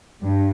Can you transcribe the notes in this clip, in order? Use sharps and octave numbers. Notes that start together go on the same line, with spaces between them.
G2